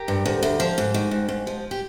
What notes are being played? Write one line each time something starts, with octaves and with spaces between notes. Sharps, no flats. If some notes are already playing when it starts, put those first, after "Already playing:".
Already playing: G4 A#4
G2
D2
D2
F3
G#2
D#3
G#2
G#2
F3
G4